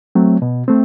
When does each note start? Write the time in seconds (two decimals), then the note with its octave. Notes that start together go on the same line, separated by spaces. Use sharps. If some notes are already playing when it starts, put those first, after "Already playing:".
0.15 F#3 A3 C4
0.42 B2
0.68 A3 C4